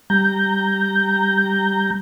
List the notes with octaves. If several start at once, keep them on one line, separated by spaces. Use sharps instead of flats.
G3 A#5 G6